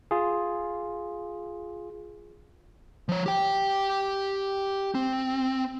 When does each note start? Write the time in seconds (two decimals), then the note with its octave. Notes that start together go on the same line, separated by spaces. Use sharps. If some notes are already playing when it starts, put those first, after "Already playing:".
0.11 F4 G#4
3.09 F3 C#5
3.26 G4 G5
4.95 C4